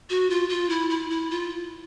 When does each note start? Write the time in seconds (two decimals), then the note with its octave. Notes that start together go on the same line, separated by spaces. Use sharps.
0.10 F#4
0.30 F4
0.49 F4
0.70 E4
0.90 E4
1.10 E4
1.31 F4